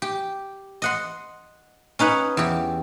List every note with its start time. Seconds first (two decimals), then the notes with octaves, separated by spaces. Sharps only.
0.02 G4
0.82 D#5 F#5 C6
1.99 C#4 D#4 B4 F#5
2.37 E2 G4